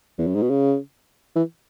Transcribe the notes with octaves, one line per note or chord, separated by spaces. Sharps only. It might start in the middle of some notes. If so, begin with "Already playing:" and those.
E2
F#2
G#2
B2
C#3
E3